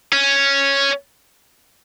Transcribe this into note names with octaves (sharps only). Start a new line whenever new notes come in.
C#4